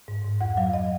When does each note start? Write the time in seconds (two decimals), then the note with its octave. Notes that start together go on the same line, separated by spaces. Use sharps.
0.08 G#2
0.25 G#2
0.41 F2 F#5
0.57 F#3 F5
0.74 D#5